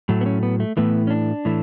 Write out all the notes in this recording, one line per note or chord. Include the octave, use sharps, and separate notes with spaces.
A2 F#3 A3
B3
C#4
B3
A3
A2 E3 A3 B3
C#4
D4
A2 E3 A3